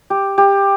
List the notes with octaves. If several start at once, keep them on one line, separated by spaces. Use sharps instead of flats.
G4
G4